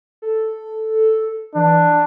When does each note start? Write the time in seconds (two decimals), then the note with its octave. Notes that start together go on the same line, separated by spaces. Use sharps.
0.22 A4
1.55 E3 D4